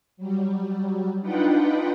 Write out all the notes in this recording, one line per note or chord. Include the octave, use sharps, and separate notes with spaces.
F#3 G3
D4 D#4 F4 B4 F#5 G5